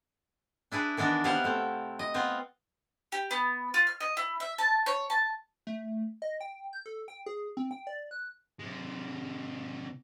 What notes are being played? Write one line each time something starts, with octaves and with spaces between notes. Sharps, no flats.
D4 E4 G#4 B4
D#3 E3 B3 D4 A#4
C3 B3 C#4 E4 F5 F#5
A3 C4
D#5
B3 C4 F4
G4
B3
F4
F6
D#5
E4
E5
A5
C#5
A5
A3
D#5
G5
G6
A4
G5
G#4
C4
G5
D5
F#6
C3 G#3